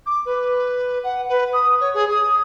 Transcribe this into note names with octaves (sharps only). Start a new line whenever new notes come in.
D6
B4
F#5
B4
D#6
C#5
G#4
D#6